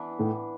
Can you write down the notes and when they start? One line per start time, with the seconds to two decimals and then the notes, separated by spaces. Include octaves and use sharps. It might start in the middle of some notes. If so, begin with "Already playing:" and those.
Already playing: E3 B3 D4
0.19 A2